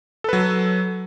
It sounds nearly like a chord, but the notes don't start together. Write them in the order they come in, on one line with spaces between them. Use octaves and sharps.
A4 B4 F#3